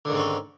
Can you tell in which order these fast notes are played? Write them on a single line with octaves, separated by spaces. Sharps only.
D3 D#3 G#2 C4 C#4